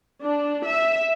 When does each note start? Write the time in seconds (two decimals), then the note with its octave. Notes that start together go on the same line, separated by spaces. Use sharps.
0.23 D4
0.65 E5